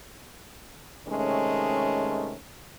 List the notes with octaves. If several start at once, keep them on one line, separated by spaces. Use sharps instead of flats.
C3 D#3 G#3 A3 C#4